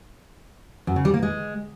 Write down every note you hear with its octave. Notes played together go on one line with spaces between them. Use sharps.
F#2
C#3
G3
A#3
G#3